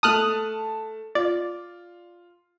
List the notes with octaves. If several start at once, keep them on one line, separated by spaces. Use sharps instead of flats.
A3 A5 D#6 F6 F#6
F4 D5